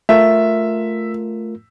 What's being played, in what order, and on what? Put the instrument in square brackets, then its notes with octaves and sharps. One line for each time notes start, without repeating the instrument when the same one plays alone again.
[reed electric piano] A3 F4 A#4 [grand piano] E5